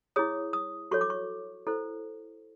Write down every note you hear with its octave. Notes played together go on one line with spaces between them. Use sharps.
E4 G#4 C#5 D#6
D#6
F#4 A4 C#5 C#6
D6
C#6
E4 A4 C5